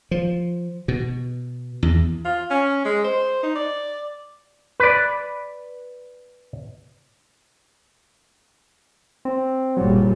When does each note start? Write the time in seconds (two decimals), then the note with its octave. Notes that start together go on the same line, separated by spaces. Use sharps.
0.11 F3
0.88 B2
1.83 E2
2.25 F4
2.51 C#4
2.85 G#3
3.04 C5
3.43 D#4
3.56 D5
4.80 B4 D5
9.25 C4
9.77 F#1 A#2 F#3 G3